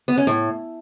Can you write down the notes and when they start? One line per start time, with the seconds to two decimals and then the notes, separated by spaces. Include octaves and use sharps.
0.08 B3
0.17 C#4
0.27 A2